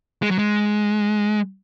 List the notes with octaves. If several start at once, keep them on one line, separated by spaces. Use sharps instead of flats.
G#3
F#3
G#3